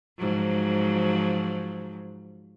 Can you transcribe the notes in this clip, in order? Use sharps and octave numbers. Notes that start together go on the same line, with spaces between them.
G#2 F3 F#3